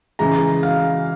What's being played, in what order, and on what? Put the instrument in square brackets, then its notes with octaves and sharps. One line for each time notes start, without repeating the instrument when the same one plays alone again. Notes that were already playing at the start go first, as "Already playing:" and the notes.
[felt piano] C#3 E3 G#3 A#5
F5